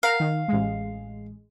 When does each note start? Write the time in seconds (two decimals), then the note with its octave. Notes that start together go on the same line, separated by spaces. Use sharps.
0.03 A#4 F5 F#5 A#5
0.20 D#3
0.48 A1 G#3